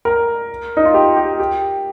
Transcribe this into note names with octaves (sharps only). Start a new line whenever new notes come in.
A#4
D#4
F4
G4
G4
G4